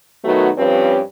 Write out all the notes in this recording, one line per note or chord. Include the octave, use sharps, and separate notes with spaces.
D#3 F#3 A3 B3 D#4 F#4
G2 F3 C4 C#4 G4 B4